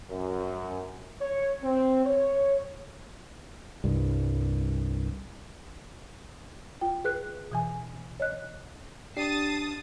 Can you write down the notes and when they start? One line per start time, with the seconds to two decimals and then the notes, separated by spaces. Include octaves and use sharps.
0.10 F#2
1.21 C#5
1.63 C4
2.06 C#5
3.84 C2 G2
6.81 F4 G5
7.04 G#4 B4 F#6
7.52 B2 E3 G#5
8.20 C#5 D#5 F#6
9.17 D4 G4 A5 D#6 A6 C7